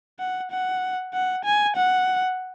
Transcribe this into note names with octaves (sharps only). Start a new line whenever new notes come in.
F#5
F#5
F#5
G#5
F#5